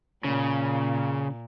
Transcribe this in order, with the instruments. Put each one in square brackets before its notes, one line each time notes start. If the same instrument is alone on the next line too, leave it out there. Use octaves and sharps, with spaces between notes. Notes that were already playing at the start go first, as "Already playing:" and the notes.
[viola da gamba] A#2 [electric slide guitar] C#3